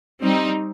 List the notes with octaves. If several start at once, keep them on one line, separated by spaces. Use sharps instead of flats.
G3 C4 D#4